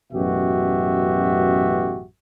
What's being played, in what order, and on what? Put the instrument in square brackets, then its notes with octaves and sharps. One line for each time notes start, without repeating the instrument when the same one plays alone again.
[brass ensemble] A1 F#2 B2 F#4 G4 E5